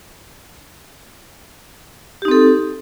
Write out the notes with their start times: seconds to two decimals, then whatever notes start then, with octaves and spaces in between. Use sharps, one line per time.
2.22 G4
2.25 D#4
2.28 C4
2.31 A4